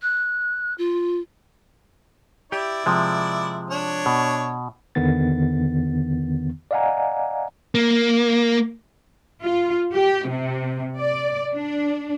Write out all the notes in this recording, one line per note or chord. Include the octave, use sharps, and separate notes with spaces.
F#6
F4
E4 G4 D5
C3 F3 G#3
D4 C#5
B2
E2 D3 D#3 B3 A6
D5 D#5 F5 F#5 G#5 A#5
A#3
F4
G4
C3
D5
D4